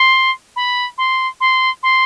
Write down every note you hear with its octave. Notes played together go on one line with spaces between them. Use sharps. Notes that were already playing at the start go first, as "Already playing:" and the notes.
Already playing: C6
B5
C6
C6
C6